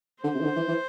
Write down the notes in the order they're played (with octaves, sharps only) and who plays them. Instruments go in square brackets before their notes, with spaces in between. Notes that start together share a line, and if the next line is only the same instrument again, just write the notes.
[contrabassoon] D3 [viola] C5
[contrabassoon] C3
E3
D3
E3
E3